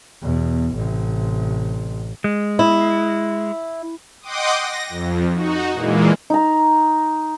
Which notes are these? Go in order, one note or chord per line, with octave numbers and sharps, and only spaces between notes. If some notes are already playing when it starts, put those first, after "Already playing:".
E2 B2
A1 C3
G#3
E4
D#5 F#5 G5 C6 D6 D#6
A#6
F2
D#4 F#4
A#2 E3 G#3 A#3
D#4 A#5